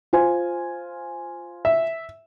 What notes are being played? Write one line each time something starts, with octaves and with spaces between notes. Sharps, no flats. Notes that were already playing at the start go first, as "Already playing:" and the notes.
F4 C5 G#5
E5